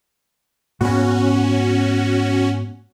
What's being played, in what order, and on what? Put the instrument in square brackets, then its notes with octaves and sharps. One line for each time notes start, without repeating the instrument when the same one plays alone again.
[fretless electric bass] G#2 A#3 B3 [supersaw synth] C#4 F#4